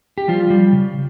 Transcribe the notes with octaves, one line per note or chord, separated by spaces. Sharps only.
G4
F3 G3 F4
G3
C#3